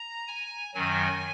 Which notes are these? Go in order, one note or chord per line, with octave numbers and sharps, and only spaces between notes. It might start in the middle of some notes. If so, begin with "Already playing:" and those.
Already playing: A#5
G#5
F#2 D#3 F#3 G#5